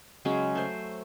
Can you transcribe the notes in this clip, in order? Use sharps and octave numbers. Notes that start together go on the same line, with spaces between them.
C#3 F#3 G#3 C#4
A3 C5